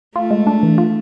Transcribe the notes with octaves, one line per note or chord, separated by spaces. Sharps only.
A3 F4
G#3
D4
E3
F4